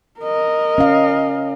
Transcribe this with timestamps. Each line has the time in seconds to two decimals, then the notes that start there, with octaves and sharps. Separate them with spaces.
0.19 A#4 D#5
0.78 C#4 F5